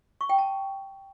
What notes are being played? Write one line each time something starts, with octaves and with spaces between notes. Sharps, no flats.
C#6
G5
A5